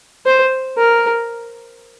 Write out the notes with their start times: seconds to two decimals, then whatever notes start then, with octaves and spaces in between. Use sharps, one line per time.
0.26 C5
0.77 A#4